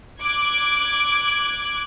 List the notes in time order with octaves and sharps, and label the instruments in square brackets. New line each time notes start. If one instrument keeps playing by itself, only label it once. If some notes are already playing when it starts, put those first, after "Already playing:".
[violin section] D6 F#6 G#6